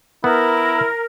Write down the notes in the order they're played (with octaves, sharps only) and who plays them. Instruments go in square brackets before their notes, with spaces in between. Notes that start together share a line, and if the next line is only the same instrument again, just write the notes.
[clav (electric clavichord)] B3 [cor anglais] E4 [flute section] A#4